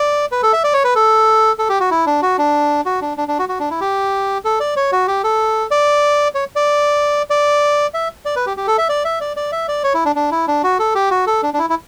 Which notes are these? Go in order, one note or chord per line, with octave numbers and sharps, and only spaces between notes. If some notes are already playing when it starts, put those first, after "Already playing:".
Already playing: D5
B4
A4
E5
D5
C#5
B4
A4
A4
G4
F#4
E4
D4
F#4
D4
F#4
D4
D4
D4
F#4
F#4
D4
E4
G4
A4
D5
C#5
F#4
G4
A4
D5
C#5
D5
D5
E5
D5
B4
G4
G4
A4
E5
D5
E5
D5
D5
E5
D5
C#5
E4
D4
D4
E4
D4
F#4
A4
G4
F#4
A4
D4
D4
E4
E4